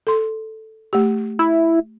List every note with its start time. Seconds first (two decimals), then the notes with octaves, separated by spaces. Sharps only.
0.07 A4 C6
0.93 A3 G4
1.39 E4